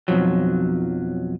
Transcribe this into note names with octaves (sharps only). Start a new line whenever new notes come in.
B1 F2 F3 F#3